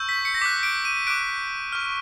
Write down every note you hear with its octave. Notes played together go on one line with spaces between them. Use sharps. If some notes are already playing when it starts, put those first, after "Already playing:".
Already playing: C#6 E6 G6
B6
C#7
A#6
D6 F#6 B6
D7
D#7
D6 F#6 D7
C#6 F6